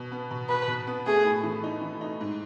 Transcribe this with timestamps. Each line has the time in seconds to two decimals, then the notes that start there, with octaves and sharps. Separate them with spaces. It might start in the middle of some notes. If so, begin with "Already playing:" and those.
Already playing: B2
0.12 B3
0.31 B2
0.49 B2 B4
0.68 B2
0.87 B3
1.06 A3 G#4
1.25 A2
1.44 E3
1.64 D#4
1.81 E3
2.01 D#4
2.21 G#2